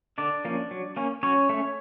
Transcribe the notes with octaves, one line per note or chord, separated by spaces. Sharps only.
D3 D4 D5
F3 A#3 C#4
F#3
A#3 C#4
F#3 C#4 C#5
A3 C#4